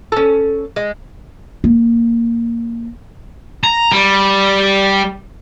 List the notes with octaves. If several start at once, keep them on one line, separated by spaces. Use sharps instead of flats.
C#4 A4
G#3
A#3
A#5
G3